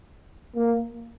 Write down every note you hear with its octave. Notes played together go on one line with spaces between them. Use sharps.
A#3